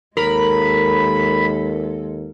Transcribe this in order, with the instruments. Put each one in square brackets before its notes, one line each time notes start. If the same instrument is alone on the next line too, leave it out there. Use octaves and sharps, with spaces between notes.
[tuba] D#2 [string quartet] G#3 A4 [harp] A#4 [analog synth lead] B5